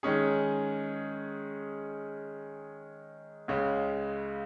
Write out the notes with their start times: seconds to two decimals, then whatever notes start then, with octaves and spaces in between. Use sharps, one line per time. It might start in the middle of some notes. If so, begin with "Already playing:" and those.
0.03 D#3 G#3 C#4 G#4
3.48 C#2 C#3 G#3